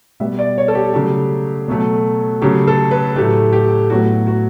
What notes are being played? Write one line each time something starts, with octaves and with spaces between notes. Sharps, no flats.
B2 G3 B3 E5
D5
C#5
A4
G4
C#3 F#3 A3 G4
B2 F#3 A3
C#3 F#3 A3 G4
A4
B4
A2 F#3 A3 G4
G4
A2 F#3 B3 F#4
F#4